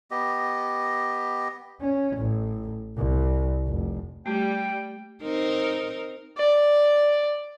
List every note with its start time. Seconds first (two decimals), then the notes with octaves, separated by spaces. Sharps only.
0.11 B3 G4 D#5
1.81 C#4
2.16 A1
2.97 C2
3.67 F1
4.26 G3 A3 G5
5.23 C4 D#4 A#4
6.38 D5